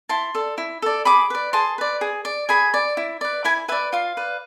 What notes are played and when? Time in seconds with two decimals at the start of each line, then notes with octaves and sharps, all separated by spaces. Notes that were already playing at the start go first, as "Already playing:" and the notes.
0.09 E4 A5 C6
0.35 A4 D5
0.58 E4
0.82 A4 D5
1.05 G#4 B5 D6
1.30 B4 D5
1.53 G#4 A5 C6
1.78 B4 D5
2.01 G#4
2.25 D5
2.49 G#4 G#5 B5
2.74 D5
2.97 E4
3.21 B4 D5
3.44 E4 G#5 B5
3.68 B4 E5 G#5
3.72 D5
3.93 F4 F5
4.17 B4 D5